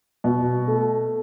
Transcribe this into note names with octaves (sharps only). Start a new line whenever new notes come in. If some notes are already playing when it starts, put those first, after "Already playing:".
B2
A3